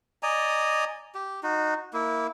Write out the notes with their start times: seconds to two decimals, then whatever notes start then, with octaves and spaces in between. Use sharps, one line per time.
0.23 D5 D#5 G#5 A#5
1.15 G4
1.43 D#4 F#4
1.93 A#3 E4